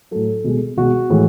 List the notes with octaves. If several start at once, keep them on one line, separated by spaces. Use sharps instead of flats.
A2 F#3 A4
B2 G#3
B2 G#3 F#4
A2 E3 G#3